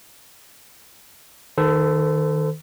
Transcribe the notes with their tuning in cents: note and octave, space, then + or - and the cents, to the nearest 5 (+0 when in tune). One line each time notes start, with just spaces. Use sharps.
D#3 +0 A4 +0 C5 -40